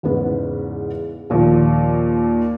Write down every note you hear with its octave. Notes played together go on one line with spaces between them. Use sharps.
E2 G#2 C#3 B3
D#2 A#2 F3